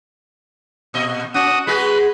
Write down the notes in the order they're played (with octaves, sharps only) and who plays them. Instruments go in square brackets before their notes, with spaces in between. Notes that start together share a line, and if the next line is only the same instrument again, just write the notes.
[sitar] A#2 D#5
[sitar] C#4 [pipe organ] F#4 D#6
[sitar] G#3 F#4 G#4 [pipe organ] B4